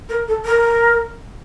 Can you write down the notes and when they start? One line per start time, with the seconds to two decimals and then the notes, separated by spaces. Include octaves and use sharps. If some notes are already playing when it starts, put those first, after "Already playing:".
0.09 A#4
0.28 A4
0.46 A#4